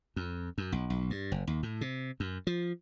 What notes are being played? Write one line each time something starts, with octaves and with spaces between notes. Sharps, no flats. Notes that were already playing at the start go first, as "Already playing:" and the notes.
F2
F#2
B1
B1
G2
F#1
D#2
A2
C3
F#2
F3